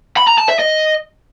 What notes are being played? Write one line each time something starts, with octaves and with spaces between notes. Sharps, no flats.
B5
A#5
A5
E5
D#5